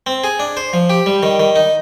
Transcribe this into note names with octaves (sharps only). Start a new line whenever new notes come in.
C4
G#4
D4
C5
F3
G4
G3
D#3
D#3
D#4